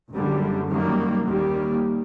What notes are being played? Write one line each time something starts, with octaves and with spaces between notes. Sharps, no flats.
F#1 F#2 D3 G3
F#2 D#3 G3 A#3
D#2 D#3 G3 A#3